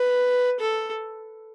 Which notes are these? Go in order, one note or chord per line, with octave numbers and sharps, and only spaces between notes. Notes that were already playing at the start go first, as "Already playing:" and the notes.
Already playing: B4
A4